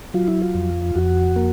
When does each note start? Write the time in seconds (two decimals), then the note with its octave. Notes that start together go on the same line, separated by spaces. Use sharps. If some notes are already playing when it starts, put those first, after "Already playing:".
0.14 F#3 F4
0.28 E4
0.42 F4
0.55 F2
0.95 F2 F#4
1.36 A#3